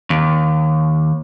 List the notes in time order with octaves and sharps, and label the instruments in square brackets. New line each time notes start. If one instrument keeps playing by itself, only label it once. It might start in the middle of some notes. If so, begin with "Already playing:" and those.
[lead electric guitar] D#2